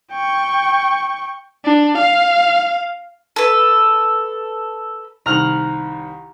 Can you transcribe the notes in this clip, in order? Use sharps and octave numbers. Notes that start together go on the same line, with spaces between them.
G5 C#6
D4
F5
A4 B4
C2 D#3 A#5 F6 F#6